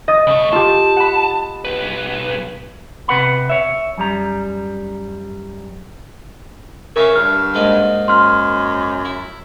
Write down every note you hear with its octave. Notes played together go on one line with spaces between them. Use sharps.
D#5 D#6 A6
C#3 A3
F4 G4 A5
F#5 B5
B1 B4
C3 B4 F#5 B5
C#5 E5
F#2 G3 A#5
C#3 A#4 C#5 E5 F5
G2 F6
G#2 A#3 D#4
F#2 C6 F6
E4